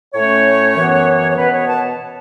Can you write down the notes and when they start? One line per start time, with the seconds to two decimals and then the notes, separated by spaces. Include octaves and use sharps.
0.13 A2 A3 C#4 C#5
0.75 F#2 E3 B3
1.31 C#5
1.36 B2 B3 B4
1.52 C#5
1.67 A5